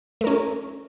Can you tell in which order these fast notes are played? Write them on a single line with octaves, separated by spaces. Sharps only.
A3 A#4 C#4